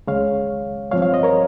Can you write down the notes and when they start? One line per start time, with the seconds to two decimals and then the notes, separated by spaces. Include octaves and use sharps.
0.07 C#2 C#3 G#3 C#5 F5
0.91 G2 F3 C4 C#5 F5
1.02 C#5 F5
1.13 C5 D#5
1.23 A#4 C#5